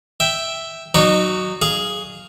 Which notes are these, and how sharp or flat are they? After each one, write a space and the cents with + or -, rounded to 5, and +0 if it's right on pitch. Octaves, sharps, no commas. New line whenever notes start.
E5 +0 G5 +0
F#3 +0 D#4 -25 C#5 +40
G#4 +0 F5 +0